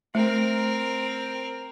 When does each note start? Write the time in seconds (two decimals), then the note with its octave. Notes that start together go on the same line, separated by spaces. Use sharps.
0.15 A3 C4 A#4